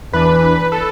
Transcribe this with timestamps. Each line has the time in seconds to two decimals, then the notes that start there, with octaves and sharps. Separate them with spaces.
0.13 E2 E3 D4 B4
0.72 A4